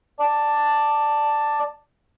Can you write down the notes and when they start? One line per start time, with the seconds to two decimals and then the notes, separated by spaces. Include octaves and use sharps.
0.20 D5 A5